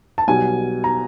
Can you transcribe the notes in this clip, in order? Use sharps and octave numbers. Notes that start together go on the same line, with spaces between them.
A5
B1 B2 G3 G#5
A#5